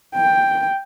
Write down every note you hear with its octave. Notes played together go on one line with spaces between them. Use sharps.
G5